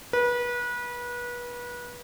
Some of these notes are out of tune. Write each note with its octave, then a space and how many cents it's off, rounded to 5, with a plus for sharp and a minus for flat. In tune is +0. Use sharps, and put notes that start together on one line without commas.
B4 -30